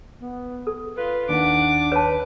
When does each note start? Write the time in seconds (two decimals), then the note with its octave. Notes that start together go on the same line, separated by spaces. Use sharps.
0.22 B3
0.67 A4
0.97 F4 B4
1.29 D#2 D#3 D4 F#5 D6
1.92 B4 C#5 A5